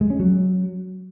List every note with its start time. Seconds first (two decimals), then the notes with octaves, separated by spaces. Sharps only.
0.01 G#3
0.10 C#4
0.19 F#3